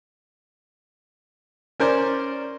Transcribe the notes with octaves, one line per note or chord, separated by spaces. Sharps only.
C#4 A#4 C5 D5